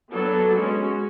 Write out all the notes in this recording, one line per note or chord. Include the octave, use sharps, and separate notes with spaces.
F#3 B3 D4 A4
G#3 C#4 F#4